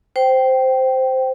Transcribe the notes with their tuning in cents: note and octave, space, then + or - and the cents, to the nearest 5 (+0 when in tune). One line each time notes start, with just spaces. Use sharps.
C5 -5 G5 -15